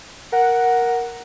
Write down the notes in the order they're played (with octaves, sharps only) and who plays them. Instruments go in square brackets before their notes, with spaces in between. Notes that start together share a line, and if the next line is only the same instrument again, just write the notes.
[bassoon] A#4 [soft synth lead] F#5